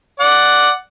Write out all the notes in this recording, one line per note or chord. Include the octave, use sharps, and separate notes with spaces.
D5 F#5